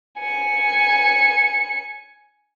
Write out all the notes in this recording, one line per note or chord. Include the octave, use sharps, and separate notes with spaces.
G#5 C#7